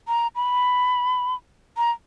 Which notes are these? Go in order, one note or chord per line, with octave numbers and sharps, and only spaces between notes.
A#5
B5
A#5